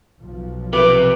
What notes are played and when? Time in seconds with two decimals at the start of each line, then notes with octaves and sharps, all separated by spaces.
0.22 B1 F3
0.73 C3 B4 D6